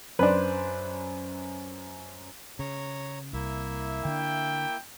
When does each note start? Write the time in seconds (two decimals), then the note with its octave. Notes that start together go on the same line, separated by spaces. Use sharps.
0.19 F#2 D4 B4 C5
2.59 C#3 C#5 A#5
3.33 C2 A#3 E4 E5
4.05 D3 D4 G5